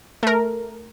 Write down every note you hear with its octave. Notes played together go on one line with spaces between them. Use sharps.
A3 A#4